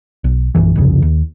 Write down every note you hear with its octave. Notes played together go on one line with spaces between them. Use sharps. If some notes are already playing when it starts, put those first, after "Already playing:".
B1
A#1 F#2 E3
G1 C2 F2 C#3
D#2